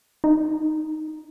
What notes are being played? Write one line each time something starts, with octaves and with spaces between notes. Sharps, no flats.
D#4